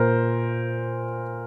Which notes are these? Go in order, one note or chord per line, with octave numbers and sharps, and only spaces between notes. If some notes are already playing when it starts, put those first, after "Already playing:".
Already playing: A#2 A#4 C5